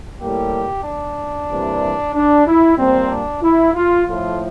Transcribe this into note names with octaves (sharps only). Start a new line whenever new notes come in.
A2 G3 A#3 G4
D4
C3 E3 G3 A#3
D4
E4
A#2 G3 A#3 C4
D4
E4
F4
A2 F3 A3 F4